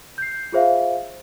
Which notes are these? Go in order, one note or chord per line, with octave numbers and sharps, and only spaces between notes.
G6 C7
F4 G#4 C5 E5 F5